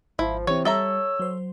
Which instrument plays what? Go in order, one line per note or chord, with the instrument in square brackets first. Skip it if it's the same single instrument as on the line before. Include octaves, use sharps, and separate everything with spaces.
[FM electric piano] G#1 [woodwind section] F3 [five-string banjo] E4
[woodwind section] C3 [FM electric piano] E3 C4 [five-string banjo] C#5
[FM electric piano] G3 [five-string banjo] A4 E5 A#5 [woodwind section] C#5 E6
[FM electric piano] F#3 C5